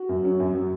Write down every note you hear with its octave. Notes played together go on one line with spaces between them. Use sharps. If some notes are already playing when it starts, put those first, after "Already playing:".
Already playing: F#4
F#2
F#3 C#4
F#2
F#3